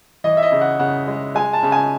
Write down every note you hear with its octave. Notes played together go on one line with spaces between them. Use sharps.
E3 D#5
E5
D#5
C#3
F#5
C#3 F#5
G#3
G#3 G#5
A5
C#3
G#5